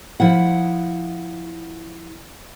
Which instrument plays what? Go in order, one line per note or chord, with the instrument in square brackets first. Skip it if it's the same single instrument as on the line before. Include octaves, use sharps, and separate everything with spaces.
[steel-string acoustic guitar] F3 E4 F#5